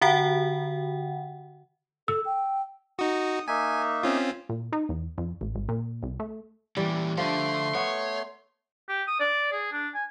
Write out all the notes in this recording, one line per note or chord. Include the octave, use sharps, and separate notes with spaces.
D3 F#4 F#5 G5
A4 E6
G5
D#4 F#4 D#6
A#3 D#4 E5 G#5
C4 C#4 F4
A#2
D#4
E2
F2
A1
G#1
A#2
C2
A3
A#2 E3 G3 D5
D3 F3 A3 A4 C6
B3 C#5
G4
D#6
D5
G#4
D4
G#5